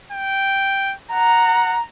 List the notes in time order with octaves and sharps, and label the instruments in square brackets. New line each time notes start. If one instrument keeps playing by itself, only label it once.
[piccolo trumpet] G5
[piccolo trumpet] F#5 [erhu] A#5